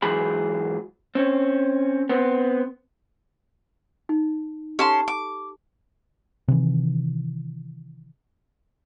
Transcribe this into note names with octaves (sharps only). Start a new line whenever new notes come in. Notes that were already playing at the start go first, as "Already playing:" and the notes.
G#2 E3 F#3 G#4 B5
C4 C#4
B3 C4
D#4
C#4 G4 A4 A5 C6
D6
C3 D#3 E3